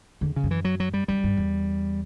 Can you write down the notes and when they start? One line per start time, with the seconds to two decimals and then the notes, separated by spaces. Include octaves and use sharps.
0.21 E2 D3
0.36 C#3
0.44 F#2
0.51 E3
0.65 F#3
0.80 F#3
0.94 G3
1.08 F#2 G3
1.24 G2
1.37 E2